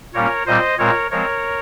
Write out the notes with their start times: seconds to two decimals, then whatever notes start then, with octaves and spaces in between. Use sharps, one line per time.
0.14 A#2 G3 A#3 C#4 A#4 C#5
0.46 A#2 G3 C4 C5 D#5
0.78 A#2 G#3 C4 A#4 C#5
1.11 F3 G#3 C4 A#4 C#5